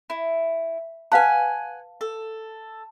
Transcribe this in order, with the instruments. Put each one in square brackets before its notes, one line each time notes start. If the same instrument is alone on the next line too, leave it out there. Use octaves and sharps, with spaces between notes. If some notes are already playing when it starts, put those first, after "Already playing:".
[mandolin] E4
[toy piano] B4 F5 A5 [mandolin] F#5 G#5
[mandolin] A4